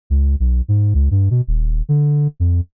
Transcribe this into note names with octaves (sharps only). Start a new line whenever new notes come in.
C#2
B1
G#2
C#2
G2
B2
D#1
D3
F2